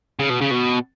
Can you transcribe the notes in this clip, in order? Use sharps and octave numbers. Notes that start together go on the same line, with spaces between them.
C#3
B2
C#3
B2